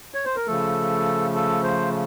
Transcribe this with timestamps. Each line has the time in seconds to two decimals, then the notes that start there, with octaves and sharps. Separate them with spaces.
0.14 C#5
0.25 C5
0.36 A#4
0.47 C#3 F3 A3 A4
1.35 A4
1.63 C5